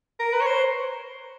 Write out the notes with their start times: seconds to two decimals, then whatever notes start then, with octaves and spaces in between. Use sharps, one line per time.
0.20 A#4
0.33 B4
0.41 C#5
0.47 C5